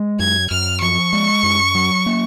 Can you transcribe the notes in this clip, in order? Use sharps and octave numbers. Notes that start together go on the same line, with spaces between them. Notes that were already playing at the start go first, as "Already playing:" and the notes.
Already playing: G#3
F#2 G#6
F#2 F6
F3 C#6
G#3
F#2
F#3
A#3